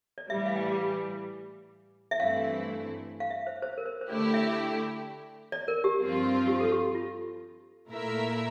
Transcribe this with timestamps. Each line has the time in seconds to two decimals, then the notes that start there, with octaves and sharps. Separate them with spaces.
0.18 D5
0.29 A2 E3 G3 E5
0.45 F5
0.56 G5
0.61 F5
2.11 E5
2.19 G2 E3 A3 C4 E4 F5
3.20 F5
3.30 E5
3.47 C5
3.62 C5
3.78 A#4
3.86 C5
4.01 C5
4.09 D3 A3 E4 G4 D5
4.34 E5
5.52 D5
5.68 A#4
5.84 G4
6.00 G2 F3 C4 F4
6.48 G4
6.61 A4
6.72 G4
6.95 F4
7.90 A#2 A3 E4 A#4 E5